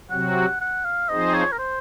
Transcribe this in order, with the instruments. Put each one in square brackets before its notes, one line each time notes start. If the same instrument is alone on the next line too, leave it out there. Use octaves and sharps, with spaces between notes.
[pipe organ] C3 F#3 C4 F#4 [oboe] F#5
[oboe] F#5
F5
[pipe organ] F3 C4 D#4 G#4 C5 [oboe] D#5
[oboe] C#5
A#4
C5